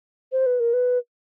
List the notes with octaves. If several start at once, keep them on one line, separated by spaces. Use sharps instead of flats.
C5
B4
A#4
B4